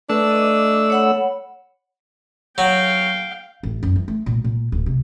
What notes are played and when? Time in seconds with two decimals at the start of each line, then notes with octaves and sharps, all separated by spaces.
0.10 A3 D4 B4 E6
0.31 D#5 D6
0.90 C#5 F#5 B5
2.58 F#3 F5 G5
3.63 A1
3.83 F#2
3.96 E3
4.08 A3
4.26 A#2
4.44 A#2
4.72 D1
4.86 C3